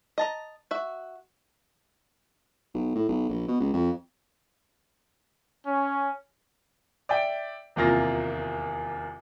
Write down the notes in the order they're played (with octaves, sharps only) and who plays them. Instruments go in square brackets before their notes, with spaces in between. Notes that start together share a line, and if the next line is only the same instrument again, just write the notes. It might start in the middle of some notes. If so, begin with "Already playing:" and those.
[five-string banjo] D#5 A5 A#5
F#4 E5
[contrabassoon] B1
A2
B1
A#1
B2
C#2
F2
[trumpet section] C#4
[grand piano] D5 E5 G5
D#1 E2 C3 A#3 F4 A#6